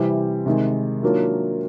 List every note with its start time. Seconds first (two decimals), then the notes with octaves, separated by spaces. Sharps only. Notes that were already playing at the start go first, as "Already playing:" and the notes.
Already playing: C3 E3 G3 C4 E4
0.46 C3 D#3 G#3
1.03 D#3 F#3 A#3 D4 F4